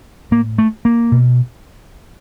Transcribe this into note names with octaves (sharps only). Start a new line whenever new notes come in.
A2 A#3
A3
A#3
B2